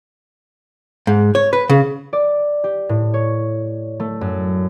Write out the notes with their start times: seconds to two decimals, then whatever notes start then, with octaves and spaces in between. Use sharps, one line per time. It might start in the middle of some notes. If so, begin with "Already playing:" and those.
1.07 G#2
1.35 C#5
1.53 B4
1.69 C#3
2.13 D5
2.64 G4
2.89 A2
3.14 C#5
4.00 A3
4.21 F#2